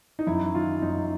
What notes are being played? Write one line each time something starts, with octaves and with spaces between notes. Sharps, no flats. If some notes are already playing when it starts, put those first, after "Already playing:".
D#4
F#2 E4
D#3 F4
F#2 D#4